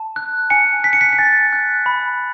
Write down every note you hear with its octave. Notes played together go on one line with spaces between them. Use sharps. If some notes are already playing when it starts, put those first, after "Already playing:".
Already playing: A5
F#6
G#5 C#7
F#6 B6
C#7
B6
B6
G#5 A6
F#6
B5